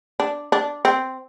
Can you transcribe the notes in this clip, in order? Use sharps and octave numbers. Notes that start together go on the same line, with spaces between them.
D4
D4
C4